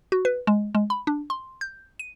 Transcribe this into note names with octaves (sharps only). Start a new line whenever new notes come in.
F#4
B4
G#3
G#3
B5
D4
C6
G6
D#7